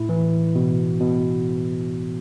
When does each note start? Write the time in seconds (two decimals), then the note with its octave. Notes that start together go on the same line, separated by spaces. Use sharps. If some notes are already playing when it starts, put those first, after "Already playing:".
Already playing: A2 E4
0.09 E3
0.55 B2
1.00 B2